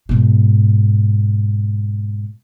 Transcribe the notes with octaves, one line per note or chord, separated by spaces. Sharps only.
G#2 B2